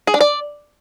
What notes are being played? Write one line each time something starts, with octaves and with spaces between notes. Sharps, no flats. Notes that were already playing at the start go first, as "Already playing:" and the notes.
G#4
D4
D5